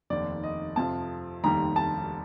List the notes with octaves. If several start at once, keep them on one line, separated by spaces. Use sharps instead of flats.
F1 D#2 D#3 D5
D#5
F2 C3 F3 A5
F1 D#2 D#3 G3 A#5
A5